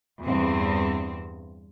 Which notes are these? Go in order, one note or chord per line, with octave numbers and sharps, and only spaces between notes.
E2 G2 C4